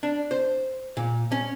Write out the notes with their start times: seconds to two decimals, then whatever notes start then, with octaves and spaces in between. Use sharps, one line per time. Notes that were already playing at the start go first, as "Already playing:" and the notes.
0.03 D4
0.31 C5
0.97 A#2
1.32 C#4